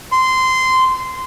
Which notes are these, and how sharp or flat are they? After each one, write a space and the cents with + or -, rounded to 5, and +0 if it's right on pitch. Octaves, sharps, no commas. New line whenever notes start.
C6 -15